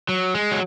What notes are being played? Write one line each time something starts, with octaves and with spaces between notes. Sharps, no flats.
F#3
G#3
F#3